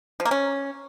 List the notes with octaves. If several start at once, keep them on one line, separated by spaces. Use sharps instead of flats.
F3
A#3
C#4